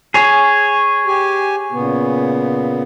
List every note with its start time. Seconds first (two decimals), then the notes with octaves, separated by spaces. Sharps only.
0.14 G#4 C#5
1.06 G4 G#5
1.72 A#2 C#3 B3